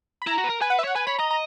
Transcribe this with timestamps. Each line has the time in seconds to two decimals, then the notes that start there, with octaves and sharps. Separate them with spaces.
0.22 B5
0.27 E4 A#5
0.38 F#4
0.44 B4
0.50 A#4
0.61 B4 G#5
0.70 F#5
0.79 E5
0.84 C#5 F#5
0.95 B4 G#5
1.07 C#5 B5
1.18 D#5 A#5
1.31 A#5